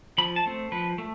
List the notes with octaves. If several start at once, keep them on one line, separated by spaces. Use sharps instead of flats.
F3 B5
A5
A3 C4
F3 B4
A3